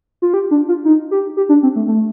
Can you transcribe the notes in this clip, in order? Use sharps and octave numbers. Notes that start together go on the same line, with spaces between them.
F4
G4
D4
F4
D#4
G4
G4
D4
C4
A3
A3